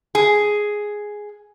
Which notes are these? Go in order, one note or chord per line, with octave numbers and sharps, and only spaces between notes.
G#4